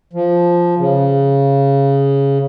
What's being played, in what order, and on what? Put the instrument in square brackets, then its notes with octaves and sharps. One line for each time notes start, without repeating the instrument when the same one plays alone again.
[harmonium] F3
C#3